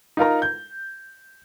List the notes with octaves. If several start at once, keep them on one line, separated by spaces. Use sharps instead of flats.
D#4 F4 A#4 A#5
G6